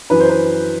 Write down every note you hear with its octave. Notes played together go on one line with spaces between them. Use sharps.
F#2 E3 B4
C5
B4